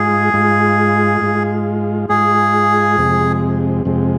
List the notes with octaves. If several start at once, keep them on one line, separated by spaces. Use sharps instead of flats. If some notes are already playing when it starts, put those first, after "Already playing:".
Already playing: G#2 G#3 F4 G#4
G#2 G#3 F4
G#2 G#3 F4
G#2 G#3 F4 G#4
F2 C3 G#3
F2 C3 G#3